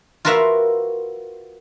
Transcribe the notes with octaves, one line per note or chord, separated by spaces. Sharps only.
F4 F#4 A#4 B4 E5 F5